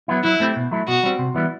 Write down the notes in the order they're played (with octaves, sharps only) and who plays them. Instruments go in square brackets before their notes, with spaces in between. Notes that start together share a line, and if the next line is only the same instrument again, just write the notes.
[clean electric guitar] F#3 B3 E4
[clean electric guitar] F#3 [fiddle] E4
[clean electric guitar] A3 C4 G4
B2
F#3 A3 E4
[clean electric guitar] B2 [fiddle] F#4
[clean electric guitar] G3 C4
C3
E3 G3 B3 E4